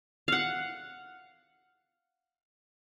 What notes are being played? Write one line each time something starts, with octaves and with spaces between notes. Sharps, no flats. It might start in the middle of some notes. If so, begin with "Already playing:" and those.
F5 F#5